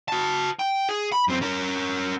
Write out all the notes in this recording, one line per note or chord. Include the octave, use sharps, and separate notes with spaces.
F#4 A5
G5
G#4
B5
F#2 C4
C#4 A#4